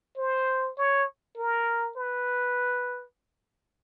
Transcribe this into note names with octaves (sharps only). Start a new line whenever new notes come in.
C5
C#5
A#4
B4